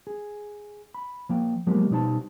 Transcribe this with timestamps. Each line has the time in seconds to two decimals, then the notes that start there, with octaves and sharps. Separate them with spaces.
0.07 G#4
0.94 B5
1.29 F3 A#3 G5
1.67 F3 F#3 G#3 A#3 B3 G4
1.91 B2 G3 D#4 C5 D5 A5